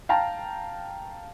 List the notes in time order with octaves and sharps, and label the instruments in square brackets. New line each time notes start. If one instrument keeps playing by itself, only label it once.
[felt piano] F5 G5 A5 A#5